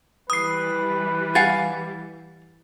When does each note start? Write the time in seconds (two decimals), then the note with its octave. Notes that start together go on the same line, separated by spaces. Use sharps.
0.30 E3 G3 B4 D#6 C7
1.35 F5 F#5 G#5 A6